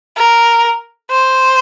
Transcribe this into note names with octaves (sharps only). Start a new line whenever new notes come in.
A#4
C5